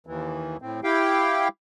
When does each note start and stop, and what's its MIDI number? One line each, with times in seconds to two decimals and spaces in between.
0.07 0.57 39
0.07 0.57 52
0.62 0.80 45
0.62 0.80 60
0.84 1.48 64
0.84 1.48 67
0.84 1.48 77
0.84 1.48 79